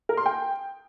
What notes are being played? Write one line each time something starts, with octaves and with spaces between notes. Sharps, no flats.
A#4
C6
G5